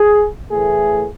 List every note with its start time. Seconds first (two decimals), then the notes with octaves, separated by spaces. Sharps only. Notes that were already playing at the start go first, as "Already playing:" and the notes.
Already playing: G#4
0.51 A2 E3 A3 G#4